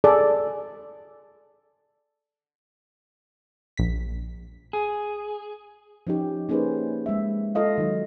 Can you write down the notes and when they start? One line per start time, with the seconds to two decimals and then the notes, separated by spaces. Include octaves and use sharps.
0.04 G#4 A4 D5
3.77 A#1 B6
4.73 G#4
6.07 F3 C#4 D#4 G4
6.49 A#3 C#4 D#4 G#4 B4 C5
7.06 G#3 E5
7.55 F4 A4 D#5 F5
7.78 D#3 F#3